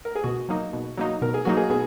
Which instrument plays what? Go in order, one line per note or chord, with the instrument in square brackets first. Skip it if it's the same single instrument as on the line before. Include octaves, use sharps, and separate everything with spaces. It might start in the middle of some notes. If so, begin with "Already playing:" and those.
[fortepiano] A#4
G#4
[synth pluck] B2 [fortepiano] F#4
[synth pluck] F#3 A#3 D#4
B2
F#3 A#3 D#4
[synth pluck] B2 [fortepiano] A#4
[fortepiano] G#4
[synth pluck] F#3 A#3 D#4 [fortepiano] F#4
[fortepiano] G#4
[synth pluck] B2 [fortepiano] G#4